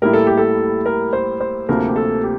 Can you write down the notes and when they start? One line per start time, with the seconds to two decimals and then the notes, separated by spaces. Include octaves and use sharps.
0.02 A2 G3 A#3 E4 A#4
0.13 A4
0.27 G4
0.37 A4
0.86 A#4
1.13 C5
1.40 C5
1.69 D2 C3 F3 A#3 A#4
1.88 G4
1.96 A4
2.23 G4